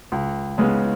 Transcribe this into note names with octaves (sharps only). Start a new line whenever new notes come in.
C#2
C#3 G#3 B3